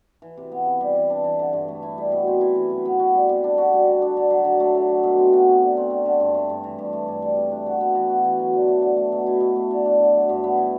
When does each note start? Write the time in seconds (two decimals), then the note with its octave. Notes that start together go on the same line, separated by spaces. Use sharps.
0.22 E3
0.37 C3
0.52 B3
0.66 C3
0.81 G3
0.96 E3
1.10 D4
1.24 E3
1.39 D3
1.53 G2
1.68 A3
1.83 E4
1.98 G3
2.12 B2
2.27 C4
2.41 E4
2.56 E3
2.70 F#2
2.85 B3
2.99 F#4
3.14 G3
3.29 C3
3.44 D4
3.58 F#4
3.73 G3
3.88 D3
4.02 D4
4.17 D3
4.30 F#3
4.45 D3
4.60 A3
4.75 D3
4.89 F#3
5.03 B2
5.18 C4
5.33 F#4
5.48 F#3
5.62 D3
5.77 C4
5.90 D3
6.05 D3
6.20 G2
6.34 A3
6.50 G2
6.64 E3
6.79 G2
6.93 A3
7.08 G2
7.22 G3
7.36 C3
7.52 D4
7.66 F#4
7.81 B3
7.95 E3
8.09 F#4
8.24 E3
8.39 F#3
8.54 D3
8.68 A3
8.82 D3
8.97 A3
9.12 B2
9.27 E4
9.40 B2
9.56 A3
9.71 D3
9.85 D4
10.00 D3
10.14 F#3
10.29 G2
10.44 B3
10.57 E4